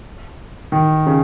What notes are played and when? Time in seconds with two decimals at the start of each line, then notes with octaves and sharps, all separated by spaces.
0.72 D#3
1.06 C#3